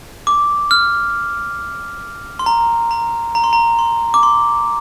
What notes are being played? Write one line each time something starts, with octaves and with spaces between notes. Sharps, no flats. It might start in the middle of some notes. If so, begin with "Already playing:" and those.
D6
F6
C6
A#5
A#5
A#5
C6
A#5
C6
D6
C6